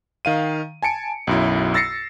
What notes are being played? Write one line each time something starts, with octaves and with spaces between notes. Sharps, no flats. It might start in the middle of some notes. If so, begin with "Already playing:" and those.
D#3 F5 D#7
G#5 A5 C#7 D7
B1 F#2 E4
E6 A6 A#6 C7 C#7